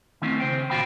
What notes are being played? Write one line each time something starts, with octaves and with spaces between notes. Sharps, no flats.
D#3 A3 C4 C#4 E4
C#3 C5 G5
A#2 C#3 F4 F#4 G5 B5